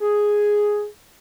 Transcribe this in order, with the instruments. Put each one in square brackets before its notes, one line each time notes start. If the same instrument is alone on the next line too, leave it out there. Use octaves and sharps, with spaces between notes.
[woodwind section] G#4